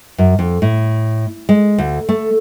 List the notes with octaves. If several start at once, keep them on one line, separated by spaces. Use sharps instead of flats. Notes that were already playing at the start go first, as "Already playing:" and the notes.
F#2
F2
A2
G#3
D2
A3